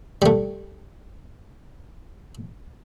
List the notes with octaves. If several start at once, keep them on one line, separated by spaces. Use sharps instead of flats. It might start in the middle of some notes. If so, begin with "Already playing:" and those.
G3 A3